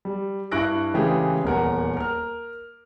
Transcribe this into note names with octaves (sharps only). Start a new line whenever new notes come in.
G3
G2 E4 C#6 F#6 A#6 D7
C#3 E3 G#3 A3 G4 G#4
D#1 E2 A#4 F#5
A#4 F6